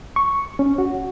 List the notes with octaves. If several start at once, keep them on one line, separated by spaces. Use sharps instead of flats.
C#6
C#4
F#4